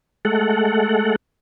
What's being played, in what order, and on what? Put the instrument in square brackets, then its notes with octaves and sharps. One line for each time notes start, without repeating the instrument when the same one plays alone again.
[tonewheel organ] G#3 A3 A4 F#5